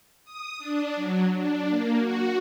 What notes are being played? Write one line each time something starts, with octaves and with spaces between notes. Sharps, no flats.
D#6
D4
F#3
D4
A#3
F#4